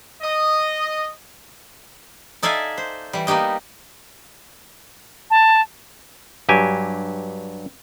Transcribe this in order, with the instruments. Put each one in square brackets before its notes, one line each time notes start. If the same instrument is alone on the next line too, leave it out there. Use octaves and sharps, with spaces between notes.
[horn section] D#5
[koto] D#4 A4 D5 E5 F5 G#5
C5
E3 G3
A#3 B3 D#4 G4 D#5
[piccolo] A5
[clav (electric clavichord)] G2 F#3 G4 G#5